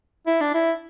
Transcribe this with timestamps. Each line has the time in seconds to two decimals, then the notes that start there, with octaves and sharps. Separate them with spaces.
0.27 E4
0.41 D4
0.54 E4